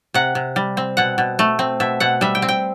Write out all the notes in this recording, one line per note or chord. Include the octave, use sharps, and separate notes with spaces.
C3 F#5
C3
G3
C4
B2 F#5
B2
A3
C4
B2 E5
B2 F#5
G3 E5
G5
C4
G5